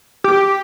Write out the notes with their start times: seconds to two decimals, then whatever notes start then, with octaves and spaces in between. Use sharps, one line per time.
0.24 G4